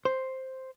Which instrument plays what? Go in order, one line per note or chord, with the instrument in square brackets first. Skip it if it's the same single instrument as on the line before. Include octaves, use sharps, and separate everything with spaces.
[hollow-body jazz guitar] C5